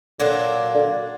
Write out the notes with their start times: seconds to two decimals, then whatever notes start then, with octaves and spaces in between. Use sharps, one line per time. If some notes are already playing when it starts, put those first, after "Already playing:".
0.20 A#2 D3 F#3 A#3 D4
0.74 D3